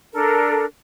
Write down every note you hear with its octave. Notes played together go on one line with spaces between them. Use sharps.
D4 A4 A#4